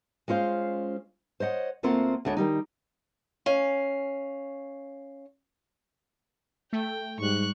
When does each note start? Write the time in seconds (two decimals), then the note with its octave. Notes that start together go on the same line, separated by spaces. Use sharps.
0.28 G#3 C#4 F4 C5 F5
1.40 C5 C#5 D#5 F#5
1.83 D2 A3 A#3 C4 F4 F#5
2.25 D2 G#3 D4 C#5 D#5
2.37 D#3 G3 D#4
3.46 C#4 F5
6.73 A3 G5
7.20 G#2 G3 C#6 F#6